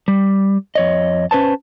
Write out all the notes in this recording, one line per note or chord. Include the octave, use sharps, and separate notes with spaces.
G3
F2 C#5 D#5
C#4 B4 C5 A5